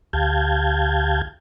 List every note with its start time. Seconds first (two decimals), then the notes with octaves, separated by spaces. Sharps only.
0.13 D2 G4 F5 A5 G6 G#6